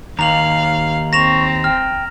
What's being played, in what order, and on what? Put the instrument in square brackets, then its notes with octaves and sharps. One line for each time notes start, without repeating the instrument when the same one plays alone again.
[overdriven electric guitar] D#2 [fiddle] F5 [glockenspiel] A#5 F7 F#7
[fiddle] C4 [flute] C#6 [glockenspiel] A#6 E7 F7
[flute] G5 [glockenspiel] F6